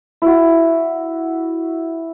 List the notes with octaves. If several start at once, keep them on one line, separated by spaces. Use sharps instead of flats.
E4 F#4